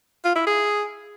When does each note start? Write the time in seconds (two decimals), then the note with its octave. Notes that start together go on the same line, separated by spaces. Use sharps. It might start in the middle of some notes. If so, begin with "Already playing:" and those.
0.25 F4
0.36 E4
0.47 G#4